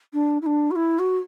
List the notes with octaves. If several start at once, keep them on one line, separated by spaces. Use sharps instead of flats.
D4
E4
D4
F#4
E4
F#4